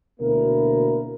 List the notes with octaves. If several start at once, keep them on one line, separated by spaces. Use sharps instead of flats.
D2 B2 A#3 E4 A#4